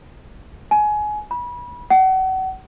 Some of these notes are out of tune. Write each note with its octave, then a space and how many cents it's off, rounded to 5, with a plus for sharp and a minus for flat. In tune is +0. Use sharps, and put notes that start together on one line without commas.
G#5 +20
B5 -25
F#5 +35